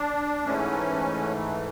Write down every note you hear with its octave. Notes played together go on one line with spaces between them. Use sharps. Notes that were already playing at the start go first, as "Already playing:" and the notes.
Already playing: D4
G#2 E3 A3 C#4